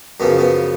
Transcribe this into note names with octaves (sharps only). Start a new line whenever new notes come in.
F#2 C#3 F3 B3
B3